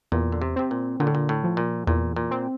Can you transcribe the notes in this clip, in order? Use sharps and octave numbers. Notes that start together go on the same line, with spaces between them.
E2 A#2
D3
C3
C3 C4
A#2
A#2 D3
A2
A#2
A2
F3
A#2
E2 A#2
A#2
C4